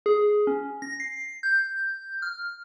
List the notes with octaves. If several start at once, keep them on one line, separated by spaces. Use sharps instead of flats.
G#4
C#4
A#6
C7
G6
F6